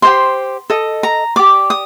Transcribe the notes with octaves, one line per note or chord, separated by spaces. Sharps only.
G4 C5 D#5 C6
A4 D#5
A#5
G4 D5 D6
D#6